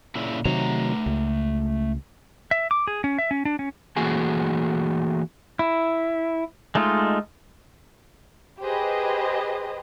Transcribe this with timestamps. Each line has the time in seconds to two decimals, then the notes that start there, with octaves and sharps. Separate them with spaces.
0.15 A#2 C#3 E4
0.45 C3 D#3 F#3 A3 F#5 A#5
1.06 C#2
2.51 E5
2.71 D6
2.87 G#4
3.04 C#4
3.18 E5
3.31 C#4
3.45 D4
3.59 C#4
3.96 E3 A3 A#3 F#4 G#4 G#5
5.59 E4
6.75 G#3 A3 D#4 F4
8.63 G4 G#4 B4 C5 D#5